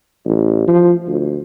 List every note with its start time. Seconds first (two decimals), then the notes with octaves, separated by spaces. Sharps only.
0.25 A1
0.68 F3
1.07 D2